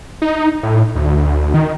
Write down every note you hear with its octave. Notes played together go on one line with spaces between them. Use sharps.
D#4
A2
D2
D#3